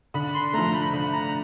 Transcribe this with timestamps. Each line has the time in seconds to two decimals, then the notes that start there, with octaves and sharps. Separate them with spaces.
0.14 D3 B5
0.34 C6
0.53 F3 A3 A#5
0.74 B5
0.93 D3 B5
1.13 A#5